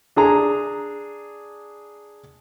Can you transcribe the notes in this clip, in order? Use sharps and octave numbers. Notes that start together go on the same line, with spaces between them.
D4 G#4 A#5